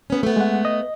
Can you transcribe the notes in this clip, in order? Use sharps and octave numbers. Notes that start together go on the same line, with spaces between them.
B3 C#4
A3 B3
G#3 F#5
D#5